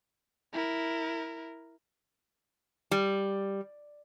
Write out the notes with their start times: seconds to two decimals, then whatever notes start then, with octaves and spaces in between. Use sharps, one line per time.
0.53 E4 A#4
2.91 G3